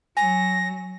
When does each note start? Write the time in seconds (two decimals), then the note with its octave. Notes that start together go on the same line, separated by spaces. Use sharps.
0.17 F#3 G#5 A#6